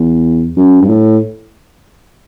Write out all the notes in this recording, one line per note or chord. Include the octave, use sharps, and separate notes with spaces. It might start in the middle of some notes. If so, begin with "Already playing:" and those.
Already playing: E2
F#2
G2
A2